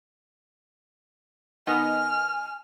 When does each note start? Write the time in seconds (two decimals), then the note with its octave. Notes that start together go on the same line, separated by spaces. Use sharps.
1.67 D#3 B3 D#5 G#5 F6